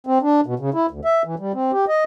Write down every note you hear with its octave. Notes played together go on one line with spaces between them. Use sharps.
C4
D4
B2
C#3
E4
D2
E5
E3
G3
C4
G4
D#5